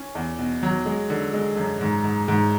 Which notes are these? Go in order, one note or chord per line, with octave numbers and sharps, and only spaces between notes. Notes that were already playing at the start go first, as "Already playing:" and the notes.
Already playing: C#4
E2
B2
F#3
G#3
D3
G#3
F#2
G#2
G#2
G#2